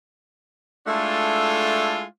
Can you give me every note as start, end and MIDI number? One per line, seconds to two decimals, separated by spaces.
0.87 2.04 56
0.87 2.04 57
0.87 2.04 62
0.87 2.04 64
0.87 2.04 65
0.87 2.04 69